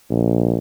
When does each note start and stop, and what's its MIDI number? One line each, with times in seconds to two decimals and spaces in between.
0.10 0.58 34